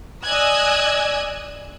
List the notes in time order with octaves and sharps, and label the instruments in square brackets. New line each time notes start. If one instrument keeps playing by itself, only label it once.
[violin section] D5 D#5 G#5 E6 F#6 G#6